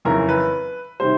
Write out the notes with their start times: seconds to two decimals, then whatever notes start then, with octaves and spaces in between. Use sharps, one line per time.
0.05 F#1 F2 C#3 E3 A#4
0.29 B4
1.00 C3 D#3 G3 C5